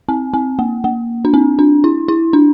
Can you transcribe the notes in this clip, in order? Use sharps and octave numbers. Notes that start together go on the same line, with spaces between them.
C4
C4
A#3
A#3
D4
C4
D4
E4
E4
D4